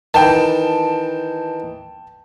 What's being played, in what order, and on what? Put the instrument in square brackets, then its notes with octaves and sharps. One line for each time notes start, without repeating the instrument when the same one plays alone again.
[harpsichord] D#3 E3 [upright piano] G5 A5